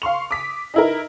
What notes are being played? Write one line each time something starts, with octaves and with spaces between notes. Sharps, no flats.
F5 C6 C#6 F7
D6 D#6 B6
D#4 E4 A#4